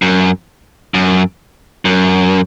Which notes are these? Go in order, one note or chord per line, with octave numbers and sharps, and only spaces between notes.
F#2
F#2
F#2